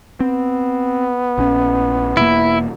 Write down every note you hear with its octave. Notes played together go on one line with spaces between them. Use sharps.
B3 C4
A#1 C#4
E1 E2 A#3 E4